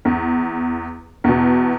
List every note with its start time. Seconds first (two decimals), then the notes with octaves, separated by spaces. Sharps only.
0.05 E2
1.24 E2 B2